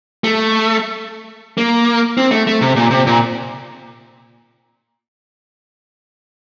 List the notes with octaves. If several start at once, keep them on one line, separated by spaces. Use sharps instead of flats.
A3
A#3
C4
A3
A3
C3
A#2
C3
A#2